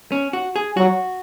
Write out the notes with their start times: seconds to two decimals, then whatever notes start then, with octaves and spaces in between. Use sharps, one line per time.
0.12 C#4
0.33 F#4
0.56 G#4
0.77 F#3 F#4